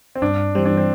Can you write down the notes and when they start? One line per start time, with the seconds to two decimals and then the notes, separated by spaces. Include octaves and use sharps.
0.15 C4
0.22 G2 D4
0.55 E3 G3 C4
0.66 D4
0.77 C4